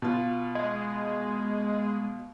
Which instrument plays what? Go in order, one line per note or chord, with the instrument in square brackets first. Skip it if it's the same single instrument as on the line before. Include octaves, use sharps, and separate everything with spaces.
[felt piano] B2 F4
[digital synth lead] G#3